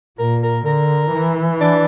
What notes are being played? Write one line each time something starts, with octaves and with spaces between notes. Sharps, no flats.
A#2 A#4
A#4
D3 A#4
E3
D4